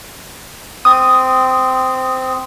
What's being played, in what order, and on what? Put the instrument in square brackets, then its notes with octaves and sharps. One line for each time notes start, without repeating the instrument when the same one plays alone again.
[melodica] C4 [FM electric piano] D#6